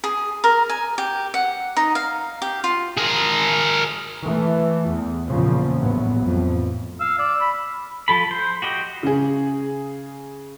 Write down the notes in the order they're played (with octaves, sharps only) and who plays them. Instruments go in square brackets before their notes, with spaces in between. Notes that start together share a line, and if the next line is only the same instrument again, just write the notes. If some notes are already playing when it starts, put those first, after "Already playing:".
[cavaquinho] G#4
A#4
G#5
G4
F#5
D#4
F5
G4
F4
[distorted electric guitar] G#4 A#4
[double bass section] E3 A3
E2
E2 A#2 C#3 F3
A1 G2 F#3 B3
A1 F2
[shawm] F5 [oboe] E6
[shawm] D5 [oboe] E6
[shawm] B5
[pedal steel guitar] F3 A4 B5
C5
F#4 G4 D#5
[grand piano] C#3 G#4